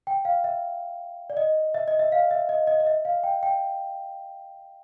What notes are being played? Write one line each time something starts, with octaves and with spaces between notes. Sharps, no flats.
G5
F5
E5
D5
D#5
E5
D#5
E5
F5
E5
D#5
D#5
D#5
E5
F5
G5
G5